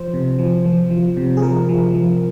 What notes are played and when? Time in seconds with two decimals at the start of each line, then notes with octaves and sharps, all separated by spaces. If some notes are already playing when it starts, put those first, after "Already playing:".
Already playing: F3 C5
0.14 C3
0.39 F3
0.65 F3
0.91 F3
1.17 C3
1.37 G#4
1.42 F3 A#4
1.69 F3
1.94 F3